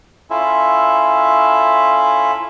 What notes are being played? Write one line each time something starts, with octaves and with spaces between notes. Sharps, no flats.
C#4 E4 F4 A4 E5